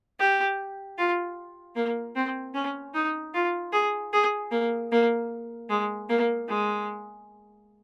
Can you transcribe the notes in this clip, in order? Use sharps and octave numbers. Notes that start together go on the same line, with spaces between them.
G4
F4
A#3
C4
C#4
D#4
F4
G#4
G#4
A#3
A#3
G#3
A#3
G#3